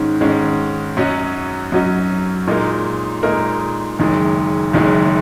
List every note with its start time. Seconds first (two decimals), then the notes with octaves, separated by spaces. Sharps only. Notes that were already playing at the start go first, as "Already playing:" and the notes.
Already playing: G#2 D#3 G#3 C#4
0.21 G#2 D#3 G#3 C#4
0.97 F#2 F#3 C#4 F#4 D#5
1.72 F#2 F#3 C#4 F#4 D#5
2.47 A#2 G#3 D#4 A#4
3.23 A#2 G#3 D#4 A#4
3.99 F#1 F#2 D#3 G#3
4.73 F#1 F#2 D#3 G#3